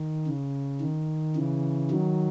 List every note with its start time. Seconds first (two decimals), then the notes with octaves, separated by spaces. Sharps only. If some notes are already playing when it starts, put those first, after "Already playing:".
Already playing: D#3
0.27 C#3
0.81 D#3
1.36 C#3 E3
1.91 D#3 F#3